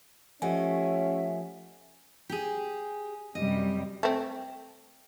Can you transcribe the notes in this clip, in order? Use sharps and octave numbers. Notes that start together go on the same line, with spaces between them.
F3 A3 C#4 G4 D#5 E5 F#5 G#5
G4 G#4
F#2 C3 G3 D#5
A3 C4